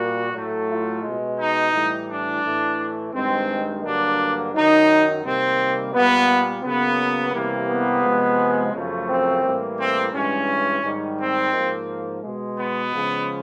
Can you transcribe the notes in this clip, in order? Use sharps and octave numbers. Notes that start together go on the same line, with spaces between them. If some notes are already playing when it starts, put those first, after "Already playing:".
Already playing: A#2 G3 A#3 F#4
A2 F#3 A3
F4
B2 G#3
D#4
A2 E3 G3
D4
A2 E3 A3
G2 D#3 G#3 C4
G2 D3 F#3 A#3 D4
F#2 D#3 F#3 D#4
C3 D#3 G3 A#3 C4
A#2 G3 A#3 B3
C#3 F#3 A#3 B3
C3 E3 G3 A#3
B3
C3 F3 G#3
F#2 C#3 F3 A3
C4
A2 E3 G3 A#3
C4
G2 E3 G#3 C#4
G#2 D#3 G3
C4
G#2 F3 A#3
B2 G#3
B3
C#3 F3 G#3